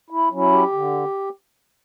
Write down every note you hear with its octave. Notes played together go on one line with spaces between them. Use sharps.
E4
F#3 C#4 E4
G4
D3